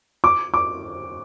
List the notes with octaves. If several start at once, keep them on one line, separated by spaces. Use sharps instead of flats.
D6
D6